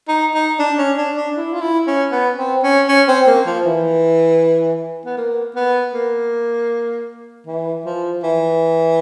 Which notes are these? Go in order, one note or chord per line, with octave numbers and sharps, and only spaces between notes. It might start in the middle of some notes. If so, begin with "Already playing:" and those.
D#4
D#4
D4
C#4
D4
D4
E4
F4
E4
C#4
B3
C4
C#4
C#4
C4
A#3
F3
E3
B3
A#3
B3
A#3
E3
F3
E3